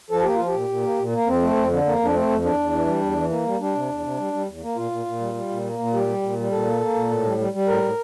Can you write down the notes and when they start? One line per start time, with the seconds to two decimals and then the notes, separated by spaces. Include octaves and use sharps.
0.11 F3 A4
0.23 A#3 G4
0.35 F4
0.40 F3
0.47 G4
0.54 A#2
0.69 A#2
0.83 A#3
0.98 A#2
1.13 A#3
1.27 F2 C4
1.42 A3
1.57 F2
1.71 D3
1.86 F2 A#3
1.99 F2
2.05 D4
2.14 A3 C4
2.29 F2
2.44 E2 D4
2.59 E2
2.73 E3
2.87 G3
3.02 E2
3.17 E3
3.31 A#3
3.46 G3
3.60 G3 D4
3.75 C3
3.89 E2
4.03 C3
4.18 G3
4.33 G3
4.47 E2
4.63 A#3
4.76 A#2 F4
4.91 A#2
5.06 A#2
5.21 G3
5.34 G3
5.49 A#2
5.64 A#3
5.79 A#2
5.94 G3 G4
6.07 G3
6.22 A#2
6.37 G3
6.51 A#2 A4
6.67 A#3
6.81 A#3
6.95 A#2
7.10 A2
7.25 G3
7.38 G3
7.53 G3
7.68 A2 A#4
7.83 A2